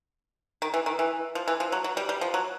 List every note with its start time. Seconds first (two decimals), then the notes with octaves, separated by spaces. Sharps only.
0.62 D#3
0.74 E3
0.86 D#3
0.99 E3
1.35 F3
1.48 E3
1.60 F3
1.72 F#3
1.84 F#3
1.97 G3
2.09 G3
2.21 F3
2.34 F#3